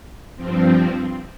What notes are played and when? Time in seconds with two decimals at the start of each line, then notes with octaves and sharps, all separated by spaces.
0.37 G2 F3 C4